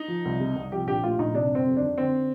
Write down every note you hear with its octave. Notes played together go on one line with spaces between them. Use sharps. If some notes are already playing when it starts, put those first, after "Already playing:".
Already playing: D#4
F3
C2
C3
C2
F3 G4
A#1 G4
A2 F4
A#1 D#4
C3 D4
G1
C4
F2
D#3 D4
D3 C4